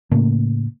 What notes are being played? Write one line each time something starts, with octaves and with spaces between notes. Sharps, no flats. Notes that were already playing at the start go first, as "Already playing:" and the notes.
A2 C#3 A3 A#3